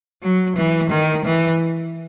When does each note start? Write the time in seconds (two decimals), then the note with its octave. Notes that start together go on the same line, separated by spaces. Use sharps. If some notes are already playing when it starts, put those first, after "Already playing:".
0.23 F#3
0.57 E3
0.90 D#3
1.25 E3